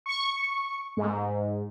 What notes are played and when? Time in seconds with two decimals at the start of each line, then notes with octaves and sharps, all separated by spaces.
0.06 C#6
0.97 G#2